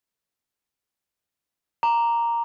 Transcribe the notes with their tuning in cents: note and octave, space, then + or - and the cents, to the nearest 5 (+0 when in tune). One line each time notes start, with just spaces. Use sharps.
A#5 +0 D6 +0